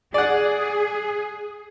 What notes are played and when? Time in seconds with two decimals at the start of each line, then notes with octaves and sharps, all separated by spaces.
0.14 G#4 D5 F#5